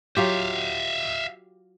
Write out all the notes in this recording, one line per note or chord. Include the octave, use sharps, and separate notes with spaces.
F#3 F4 G4 E5 F5